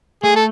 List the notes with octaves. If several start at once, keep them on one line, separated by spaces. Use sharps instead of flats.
A3 G#4
A4